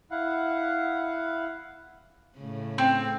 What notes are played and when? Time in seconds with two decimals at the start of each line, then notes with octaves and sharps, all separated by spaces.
0.11 E4 F5 F#5
2.37 A2 C#3
2.78 C4